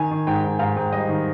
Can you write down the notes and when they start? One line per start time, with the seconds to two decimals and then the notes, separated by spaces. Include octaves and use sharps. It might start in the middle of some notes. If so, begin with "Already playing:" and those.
Already playing: D#3 G#5
0.11 D#3
0.27 G#2 G5
0.44 G#2
0.59 G#2 F5
0.77 G#2
0.92 G3 D#5
1.09 D#3